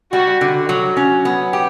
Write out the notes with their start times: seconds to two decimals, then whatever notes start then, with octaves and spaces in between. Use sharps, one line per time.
0.13 G3 F#4
0.41 D3
0.69 F#3
0.97 C#4
1.25 B3
1.53 G4